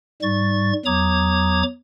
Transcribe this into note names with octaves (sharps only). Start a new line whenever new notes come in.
G#2 G3 C#6 A6
E2 F#3 A#5 D6 D#6 G#6